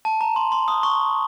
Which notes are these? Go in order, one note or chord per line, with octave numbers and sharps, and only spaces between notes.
A5
A#5
C6
C6
D#6
C#6